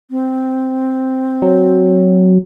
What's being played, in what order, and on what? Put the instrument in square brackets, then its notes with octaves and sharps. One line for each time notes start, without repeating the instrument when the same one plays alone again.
[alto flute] C4
[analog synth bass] F#3